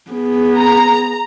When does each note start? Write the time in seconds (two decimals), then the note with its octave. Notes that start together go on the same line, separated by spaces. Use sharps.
0.11 B3 G#4
0.57 A#5